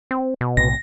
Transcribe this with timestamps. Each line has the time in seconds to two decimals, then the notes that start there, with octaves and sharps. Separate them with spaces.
0.11 C4
0.41 B2
0.57 B1 A2 C3 A#6